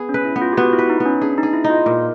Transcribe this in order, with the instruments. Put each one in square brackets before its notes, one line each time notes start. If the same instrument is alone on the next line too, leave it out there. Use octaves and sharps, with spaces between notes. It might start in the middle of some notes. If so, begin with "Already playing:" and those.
Already playing: [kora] B3 G#4
[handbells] C#4
[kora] B4
[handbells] E4
[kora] B3
[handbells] F4
G4
[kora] B3 [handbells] F#4
[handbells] E4
[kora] B4
[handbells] D#4
[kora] B3
[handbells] C#4
[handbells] D4 [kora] G#4
[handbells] D#4
[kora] G#4
[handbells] E4
[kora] D#4
[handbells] F4
[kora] A#2 [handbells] A#4